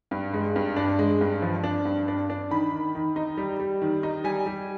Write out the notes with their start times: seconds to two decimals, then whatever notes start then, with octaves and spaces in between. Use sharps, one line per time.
0.11 G2
0.34 G#3
0.56 G2
0.77 D4
0.99 G#3
1.21 G2
1.42 F3
1.64 D4
1.85 G2
2.08 D4
2.30 D4
2.51 D#3 B5
2.72 D#3
2.95 D#3
3.16 D#4
3.37 G3
3.60 G3
3.82 D#3
4.03 D#4
4.24 G3 G#5
4.46 G3